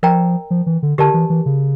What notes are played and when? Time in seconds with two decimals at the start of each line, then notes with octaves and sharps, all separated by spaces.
0.03 F3 A#4 D5 G5 A#5
0.51 F3
0.66 E3
0.83 D3
0.98 D3 G4 A#4 D5 A5
1.14 E3
1.30 E3
1.46 C#3